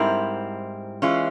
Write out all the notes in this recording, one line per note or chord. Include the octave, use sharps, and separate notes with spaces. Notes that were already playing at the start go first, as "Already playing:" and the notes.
Already playing: G#2 G3 C4 E4 A#4
E3 G#3 C#4 F4